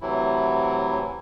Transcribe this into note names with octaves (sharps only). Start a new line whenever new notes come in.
A2 C3 E3 F#3 E4